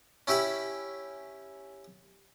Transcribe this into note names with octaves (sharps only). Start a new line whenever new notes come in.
C#4 E4 G4 E5 B5